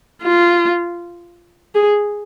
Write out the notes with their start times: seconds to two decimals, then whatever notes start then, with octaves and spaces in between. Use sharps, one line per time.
0.23 F4
1.75 G#4